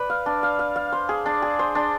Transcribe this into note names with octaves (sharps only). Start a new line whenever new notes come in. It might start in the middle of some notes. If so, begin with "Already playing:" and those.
Already playing: B4 D5
F5
D4
F5
F5
F5
C5
G#4
D4
G#4
C5
D4